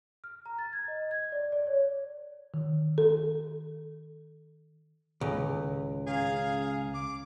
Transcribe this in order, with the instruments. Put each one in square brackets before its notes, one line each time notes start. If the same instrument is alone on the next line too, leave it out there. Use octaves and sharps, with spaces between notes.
[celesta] F6
A#5
A6
G#6
D#5
G#6
D5
D5
C#5
[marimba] D#3
A4
[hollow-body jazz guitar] C#2 [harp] A2 D#3
[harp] C#4 A#5 [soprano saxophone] G#4 [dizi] F5
[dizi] D6